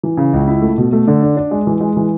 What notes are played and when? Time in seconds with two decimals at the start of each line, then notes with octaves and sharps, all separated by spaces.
0.03 E3
0.17 C#3
0.33 C#2
0.47 E4
0.62 A3
0.78 B2
0.93 A3
1.07 D3
1.22 D4
1.37 D4
1.51 G#3
1.67 E3
1.81 G#3
1.97 E3